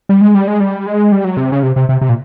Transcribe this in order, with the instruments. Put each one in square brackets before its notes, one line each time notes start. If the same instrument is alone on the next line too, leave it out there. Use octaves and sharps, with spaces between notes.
[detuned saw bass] G3
G#3
G3
G#3
G3
G#3
G3
F#3
C3
C#3
C3
C3
C3
C3
A#2